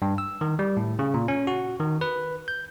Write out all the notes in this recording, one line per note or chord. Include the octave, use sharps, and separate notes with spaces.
G2
E6
D#3
G3
A2
C#3
A#2
C#4
F#4
D#3
B4
G6